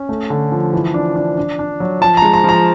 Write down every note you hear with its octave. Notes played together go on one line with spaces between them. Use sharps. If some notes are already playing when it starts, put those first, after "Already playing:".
Already playing: C#4
A3
D3
F3
E3
D4
D4
D4
D4
F#3
F3 A5
G#3 A#5
A#5
F3 A#5